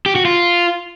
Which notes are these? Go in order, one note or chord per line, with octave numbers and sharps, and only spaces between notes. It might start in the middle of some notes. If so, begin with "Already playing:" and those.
G4
F#4
F4